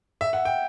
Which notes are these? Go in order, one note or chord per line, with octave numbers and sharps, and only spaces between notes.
E5
F#5
G5